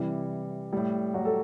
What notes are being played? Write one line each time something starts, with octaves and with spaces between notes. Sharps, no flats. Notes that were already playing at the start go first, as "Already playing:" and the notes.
Already playing: C3 E3 G3
A2 G3
F#3 F#4
A3 A4